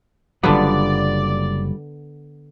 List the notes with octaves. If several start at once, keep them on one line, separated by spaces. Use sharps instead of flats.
F#1 D3 F#3 G3 B3 F4 D5